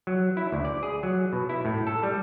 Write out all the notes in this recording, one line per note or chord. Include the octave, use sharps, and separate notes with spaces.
F#3
E4
D2
D5
G#4
F#3
B2
E4
A2
A4
G3